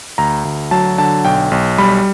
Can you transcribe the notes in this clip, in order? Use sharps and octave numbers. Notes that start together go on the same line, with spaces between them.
D2 A#5
D2
F#3 A5
D3 A5
B1 G5
B1
G3 B5